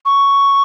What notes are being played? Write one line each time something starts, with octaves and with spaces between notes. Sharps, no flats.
C#6